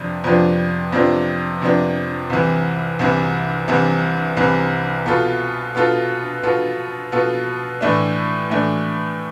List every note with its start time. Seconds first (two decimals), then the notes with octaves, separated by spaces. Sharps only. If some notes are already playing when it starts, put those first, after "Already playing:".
Already playing: F2 C3 F3 B3 D4
0.24 F2 C3 F3 B3 D4
0.92 F2 C3 F3 B3 D4
1.62 F2 C3 F3 B3 D4
2.30 C2 C3 E3
2.99 C2 C3 E3
3.68 C2 C3 E3
4.37 C2 C3 E3
5.06 B2 B3 F4 A4
5.75 B2 B3 F4 A4
6.43 B2 B3 F4 A4
7.12 B2 B3 F4 A4
7.81 A2 E3 A3 D4
8.50 A2 E3 A3 D4